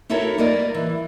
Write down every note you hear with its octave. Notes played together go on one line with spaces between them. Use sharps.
D#4 E4 F#4 A4 A#4 C#5
G3 A#3 B3 A#4 D5 D#5
E3